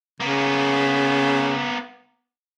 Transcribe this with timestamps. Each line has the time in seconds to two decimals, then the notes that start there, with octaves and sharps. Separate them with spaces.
0.20 C#3 A#3 B3